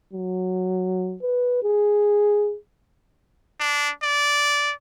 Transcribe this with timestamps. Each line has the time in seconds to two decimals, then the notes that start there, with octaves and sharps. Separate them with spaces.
0.13 F#3
1.22 B4
1.63 G#4
3.60 D4
4.03 D5